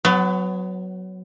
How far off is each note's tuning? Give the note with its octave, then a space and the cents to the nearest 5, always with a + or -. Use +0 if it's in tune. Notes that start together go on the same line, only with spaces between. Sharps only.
F#3 +0 B3 +30